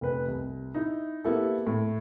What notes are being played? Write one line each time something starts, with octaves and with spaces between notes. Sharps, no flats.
F1 B4
C2
D#4 E4
A#3 B3 E4 G4 A4
A2